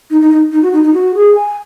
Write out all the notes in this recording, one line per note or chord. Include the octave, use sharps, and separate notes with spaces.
D#4
D#4
D#4
D#4
F#4
D#4
D#4
F#4
G#4
G#5